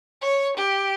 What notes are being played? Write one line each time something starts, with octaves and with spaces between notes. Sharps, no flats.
C#5
G4